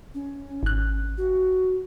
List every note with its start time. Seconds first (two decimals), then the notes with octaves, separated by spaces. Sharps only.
0.14 C#4
0.63 G#1 F#6
1.18 F#4